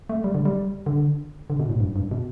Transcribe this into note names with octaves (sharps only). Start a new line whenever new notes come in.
A3
G3
D3
G3
D3
D3
B2
A2
G2
G2
B2